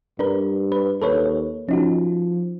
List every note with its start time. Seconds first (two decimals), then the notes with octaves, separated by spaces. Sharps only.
0.19 G2 D4 A#4 B4
0.72 B4
1.02 D#2 A4 B4 C#5
1.69 F3 C#4 D#4 F#4